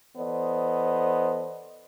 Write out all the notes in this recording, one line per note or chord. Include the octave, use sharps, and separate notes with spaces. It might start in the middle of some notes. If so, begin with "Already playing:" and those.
E3 B3 A4 C5 D5 D#5